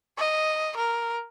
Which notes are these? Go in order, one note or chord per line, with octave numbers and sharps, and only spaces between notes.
D#5
A#4